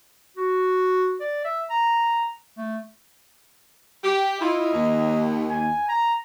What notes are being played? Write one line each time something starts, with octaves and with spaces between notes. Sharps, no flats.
F#4
D5
E5
A#5
A3
G4
E4 F4 D#5
D#2
G#5
A#5